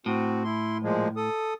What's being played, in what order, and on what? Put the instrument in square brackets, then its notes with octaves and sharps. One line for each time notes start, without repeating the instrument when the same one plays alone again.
[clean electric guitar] A2 [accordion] C4 F#4
[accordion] E4 C6
A#2 F3 G#3
A4 D#6